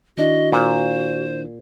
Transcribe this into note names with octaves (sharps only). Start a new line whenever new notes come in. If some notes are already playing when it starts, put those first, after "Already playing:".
D#3 D4 E4 F#4 D#5
A#2 C5